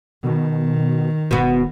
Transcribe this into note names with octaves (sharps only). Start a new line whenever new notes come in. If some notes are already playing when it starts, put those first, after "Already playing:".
B2 D#3
E1 B2 B3